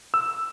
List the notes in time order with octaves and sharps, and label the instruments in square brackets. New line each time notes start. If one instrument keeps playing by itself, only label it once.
[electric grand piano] E6